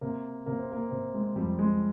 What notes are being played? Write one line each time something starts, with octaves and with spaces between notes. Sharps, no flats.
C3 A#3
C3 A#3
C4
A#3
C3 C4
G#3
F2 G3
G#3